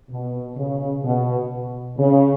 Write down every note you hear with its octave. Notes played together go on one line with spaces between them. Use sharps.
B2
C#3
B2
C#3